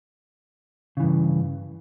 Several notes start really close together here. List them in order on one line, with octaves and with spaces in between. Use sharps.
C#3 E3 G2